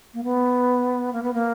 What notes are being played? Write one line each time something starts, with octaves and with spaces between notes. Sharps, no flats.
A#3
B3
A#3
B3
A#3